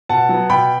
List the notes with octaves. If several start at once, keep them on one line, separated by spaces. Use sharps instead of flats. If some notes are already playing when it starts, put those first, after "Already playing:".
B2 F#5 A5
F#3 B3
B2 G5 B5